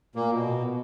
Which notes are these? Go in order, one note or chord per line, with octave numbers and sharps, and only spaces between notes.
A#2 A#3
B2